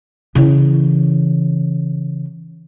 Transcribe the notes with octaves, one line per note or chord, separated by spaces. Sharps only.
C#3 E3